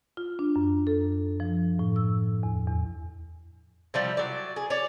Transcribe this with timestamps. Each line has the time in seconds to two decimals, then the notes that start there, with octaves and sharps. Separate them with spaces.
0.17 F4
0.39 D4
0.56 F#2
0.87 A4
1.40 F3
1.79 A2
1.96 E6
2.43 E2
2.68 E2
3.94 C3 F3 G3
4.17 F#3 D5
4.56 G#4
4.70 C#5 D5